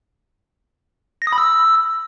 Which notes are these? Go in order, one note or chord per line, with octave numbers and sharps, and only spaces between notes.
A#6
D#6
B5
E6